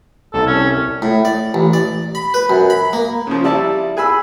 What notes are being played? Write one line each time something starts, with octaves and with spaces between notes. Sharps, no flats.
C2 A4
C#4
A2
D5
A1
D5
B5
B4
F#2
B5
A#3
C#3 F3
G3 E4 D5 E5 A5
G#4 G#5 B5 E6